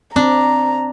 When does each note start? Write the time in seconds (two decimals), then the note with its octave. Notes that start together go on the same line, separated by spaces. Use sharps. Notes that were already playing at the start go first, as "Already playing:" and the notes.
0.16 C4 D4 A#5